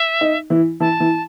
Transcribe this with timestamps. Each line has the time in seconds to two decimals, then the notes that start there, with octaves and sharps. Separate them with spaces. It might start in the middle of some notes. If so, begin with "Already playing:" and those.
Already playing: E5
0.21 D#4
0.50 E3 E4
0.80 E3 E4 A5
1.00 E3 E4